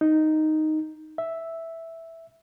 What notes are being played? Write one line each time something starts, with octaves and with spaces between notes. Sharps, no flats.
D#4
E5